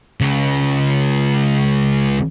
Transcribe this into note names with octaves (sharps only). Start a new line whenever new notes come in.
C#2 C#3